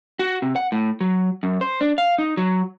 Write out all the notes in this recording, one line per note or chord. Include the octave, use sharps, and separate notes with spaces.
F#4
C3
F#5
A2
F#3
F#2
C5
D4
F5
D#4
F#3